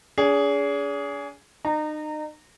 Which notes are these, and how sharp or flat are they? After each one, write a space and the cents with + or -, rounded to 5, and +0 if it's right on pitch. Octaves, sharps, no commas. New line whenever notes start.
D4 -45 G#4 +0
D#4 -35 A#5 -20